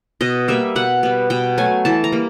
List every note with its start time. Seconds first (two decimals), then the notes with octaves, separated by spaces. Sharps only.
0.21 B2 D#5
0.48 G3 A#3 E5
0.76 B2 F#5
1.03 G3 B3
1.30 B2 G5
1.58 F#3 A3 G#5
1.85 E3 A5
2.04 A#5
2.12 G3 A#3